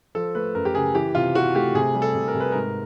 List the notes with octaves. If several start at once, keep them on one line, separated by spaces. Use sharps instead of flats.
F3 A4
A3 B4
F#2 A#4
G4
C#3 G#4
E3 G4
C3 F4
E3 F#4
A3 G4
C3 G#4
G3
A4
C3
A#4
C3
B4
G#2 A#4